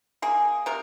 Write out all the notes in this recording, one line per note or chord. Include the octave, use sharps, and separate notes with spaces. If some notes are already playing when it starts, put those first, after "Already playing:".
A#3 G#4
C3 A#4